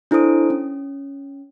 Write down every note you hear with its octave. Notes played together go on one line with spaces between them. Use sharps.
D4 E4 A4 C5 D#6 D7
C#4